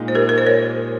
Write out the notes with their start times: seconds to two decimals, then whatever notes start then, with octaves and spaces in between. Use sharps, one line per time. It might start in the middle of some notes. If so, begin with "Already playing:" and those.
Already playing: A#2 G#3 D#4
0.08 C5
0.15 G4 A#4
0.29 A#4
0.38 C5
0.46 A#4 C#5